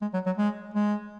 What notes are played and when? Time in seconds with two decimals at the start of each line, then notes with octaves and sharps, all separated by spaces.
0.02 G#3
0.14 F#3
0.26 F#3
0.38 G#3
0.74 G#3